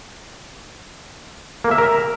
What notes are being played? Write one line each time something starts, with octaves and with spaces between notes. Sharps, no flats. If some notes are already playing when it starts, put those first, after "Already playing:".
A#3
E5
A#4